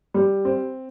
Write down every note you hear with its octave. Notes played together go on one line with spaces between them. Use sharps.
G3
C4